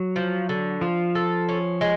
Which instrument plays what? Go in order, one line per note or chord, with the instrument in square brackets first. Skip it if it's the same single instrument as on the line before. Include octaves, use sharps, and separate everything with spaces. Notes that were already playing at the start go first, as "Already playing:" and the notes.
Already playing: [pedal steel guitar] F#3
[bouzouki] F3
D3
[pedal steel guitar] F3 [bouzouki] F4
[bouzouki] A4
C#4
G#3